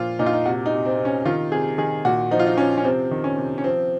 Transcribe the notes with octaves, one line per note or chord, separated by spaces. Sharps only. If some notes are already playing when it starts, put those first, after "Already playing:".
Already playing: A#2 F3 F4
A#2 D#4
F4
D#4
C3 F#4
D#4
C3
C4
C3
C#4
D#3 F4
C3 G#4
D#3 G#4
A#2 F#4
F3 D#4
F4
D#4
F3 C#4
C#4
C3 C4
D#3
C#4
C3
C#4
F3 C4